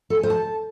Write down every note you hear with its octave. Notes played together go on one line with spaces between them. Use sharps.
A4
G#5
C5
A5